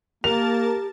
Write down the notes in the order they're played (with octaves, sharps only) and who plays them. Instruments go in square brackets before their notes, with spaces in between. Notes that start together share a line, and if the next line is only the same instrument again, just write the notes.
[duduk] A#3 [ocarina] G4 [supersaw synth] A#4 A5 A6 [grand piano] F7